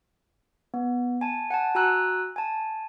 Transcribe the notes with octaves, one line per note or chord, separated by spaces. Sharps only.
B3
G#5 A5
F#5 G#5 A5
F#4 G#5 A#5 E6 F#6
G#5 A5